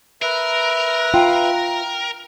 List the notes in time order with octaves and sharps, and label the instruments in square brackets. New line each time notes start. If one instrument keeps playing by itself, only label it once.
[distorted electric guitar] A#4 [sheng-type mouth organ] B4 E5
[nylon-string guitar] F4 [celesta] G5